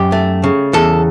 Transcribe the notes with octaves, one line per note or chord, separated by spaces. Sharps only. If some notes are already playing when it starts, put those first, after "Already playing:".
Already playing: F#2 G4
A3
C#3
E2 A4